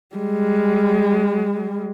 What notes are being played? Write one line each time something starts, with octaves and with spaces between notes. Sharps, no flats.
G3 G#3